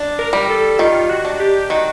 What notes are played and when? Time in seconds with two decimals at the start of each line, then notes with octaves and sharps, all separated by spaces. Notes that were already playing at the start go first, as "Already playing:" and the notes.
Already playing: D4
0.19 A#4
0.33 G3
0.49 A4
0.79 D#3 F4
1.09 F#4
1.25 D4
1.40 G4
1.70 D#3 F#4